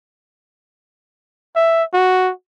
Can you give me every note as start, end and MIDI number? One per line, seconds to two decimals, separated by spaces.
1.56 1.83 76
1.94 2.31 66